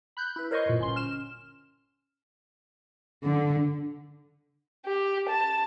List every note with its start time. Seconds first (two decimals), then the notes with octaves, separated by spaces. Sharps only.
0.17 B5 F#6 G6
0.36 E4 B4
0.51 A#4 C5 C#5 D#5 C6 C#6
0.66 F#2 A#2
0.78 G1 C#4 C6
0.96 F6 E7
3.25 D3
4.86 G4
5.29 A5